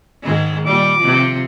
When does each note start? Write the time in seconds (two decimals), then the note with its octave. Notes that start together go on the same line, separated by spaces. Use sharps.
0.23 G#2 D#3 G#3
0.66 A#2 G3 D6
1.00 C3 F3